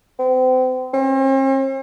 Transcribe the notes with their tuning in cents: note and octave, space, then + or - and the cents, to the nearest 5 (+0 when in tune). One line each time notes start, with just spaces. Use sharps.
C4 -35
C4 +45